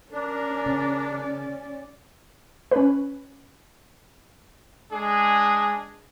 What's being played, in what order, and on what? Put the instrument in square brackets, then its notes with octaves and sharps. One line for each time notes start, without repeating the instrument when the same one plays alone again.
[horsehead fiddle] C#4 D5 [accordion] D4 [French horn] A#4
[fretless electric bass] C#3
[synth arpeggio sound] C#4 B4
[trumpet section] G#3 D4 G#4